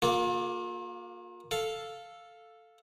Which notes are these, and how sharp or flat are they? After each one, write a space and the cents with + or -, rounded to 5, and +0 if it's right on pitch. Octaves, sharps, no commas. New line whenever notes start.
A#3 +0 F4 +35 G#4 +45
A4 +0 F5 +0